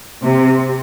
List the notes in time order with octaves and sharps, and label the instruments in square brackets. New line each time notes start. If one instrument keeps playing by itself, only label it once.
[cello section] C3